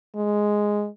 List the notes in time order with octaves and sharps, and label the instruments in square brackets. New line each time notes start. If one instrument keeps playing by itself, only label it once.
[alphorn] G#3